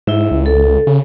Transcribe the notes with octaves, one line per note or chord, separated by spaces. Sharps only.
G#2 E4 E5
C#2
A4
C#3